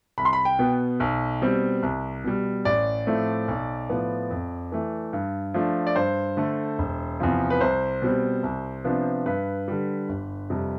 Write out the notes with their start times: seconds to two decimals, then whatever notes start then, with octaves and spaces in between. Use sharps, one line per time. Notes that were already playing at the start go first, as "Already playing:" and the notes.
0.18 C2 B5
0.25 C6
0.33 B5
0.45 G5
0.59 B2 B3
1.00 B1
1.42 B2 G3 C4
1.83 C2
2.24 B2 G3
2.65 A1 D5
3.07 A2 F3 A3 C4
3.48 B1
3.89 A2 F3 B3
4.30 F2
4.72 E3 A3
5.13 G2
5.54 F3 A3 D4
5.87 D5
5.96 G2 C5
6.37 D3 A3
6.78 E1
7.20 E2 C3 F3
7.50 B4
7.61 C2 C5
8.02 B2 G3 C4
8.43 C2
8.84 C3 F3 B3 D4
9.26 G2 B4
9.68 D3 G3
10.09 G1
10.50 F2 C3 G3